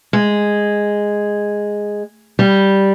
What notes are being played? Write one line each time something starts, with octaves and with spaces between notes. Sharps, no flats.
G#3
G3